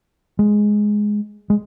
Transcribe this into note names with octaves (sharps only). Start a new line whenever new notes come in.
G#3
G#3